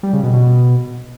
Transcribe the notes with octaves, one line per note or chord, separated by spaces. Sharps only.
G3
C#3
B2
B2